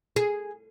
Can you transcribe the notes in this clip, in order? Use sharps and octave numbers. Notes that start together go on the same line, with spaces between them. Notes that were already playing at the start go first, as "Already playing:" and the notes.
G#4